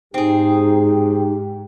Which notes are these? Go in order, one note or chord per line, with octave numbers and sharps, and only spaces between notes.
G#2 C4 D#4 G4 G#4